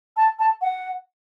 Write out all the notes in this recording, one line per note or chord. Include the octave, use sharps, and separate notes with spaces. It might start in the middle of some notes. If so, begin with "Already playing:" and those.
A5
A5
F#5